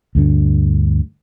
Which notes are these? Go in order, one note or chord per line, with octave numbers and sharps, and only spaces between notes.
D2 G2 D3